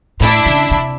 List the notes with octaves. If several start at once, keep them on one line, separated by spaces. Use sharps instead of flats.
A2 D4 E4
C#3
C3